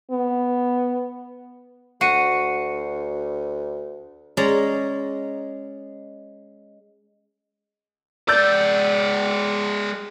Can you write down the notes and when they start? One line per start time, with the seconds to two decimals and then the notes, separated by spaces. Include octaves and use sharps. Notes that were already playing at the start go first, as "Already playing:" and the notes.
0.11 B3
2.01 D2 F#4 C7 C#7 D#7
4.37 G#3 C#4 D5 A#5
8.28 G#3 D5 E6 G6 A6